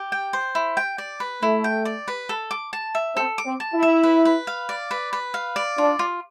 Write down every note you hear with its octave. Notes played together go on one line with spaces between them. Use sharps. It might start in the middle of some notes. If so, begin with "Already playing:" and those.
Already playing: G4
G5
C5
E4
G5
D5
B4
A3 E4
G5
D5
B4
A4
D6
A5
E5
C4 A4
D6
C4
A5
E4
E5
B4
B4
F5
D5
B4
B4
F5
D5
D4 F4
F4